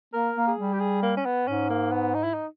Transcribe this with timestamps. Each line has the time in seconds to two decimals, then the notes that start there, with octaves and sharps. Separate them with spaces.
0.13 A#3 A#4
0.36 A#3
0.47 G#4
0.58 G3
0.72 G4
0.80 G#4
1.03 A#3
1.17 C#4
1.25 B3
1.47 G#2 C#4
1.70 A#3
1.92 B3
2.14 D#4
2.24 E4
2.34 D#4